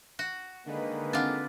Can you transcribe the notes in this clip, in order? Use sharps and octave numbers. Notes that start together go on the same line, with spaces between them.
F#4
D3 D#3 G#3 A#3 B4
C4 D4 F4 F#5